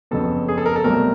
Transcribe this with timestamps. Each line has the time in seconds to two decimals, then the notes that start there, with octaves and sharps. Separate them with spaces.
0.11 F#1 F2 C#3 F#3 B3 A4
0.48 G#4
0.58 A4
0.66 A#4
0.76 A4
0.84 C2 B2 F#3 A3 C4 A#4